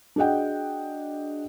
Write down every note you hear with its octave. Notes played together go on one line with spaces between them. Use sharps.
D4 F#4 G#4 D#5 F#5 G5